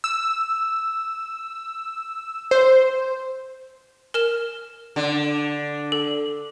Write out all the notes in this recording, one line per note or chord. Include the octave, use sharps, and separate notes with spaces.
E6
C5
A#4 F6 E7
D3
A4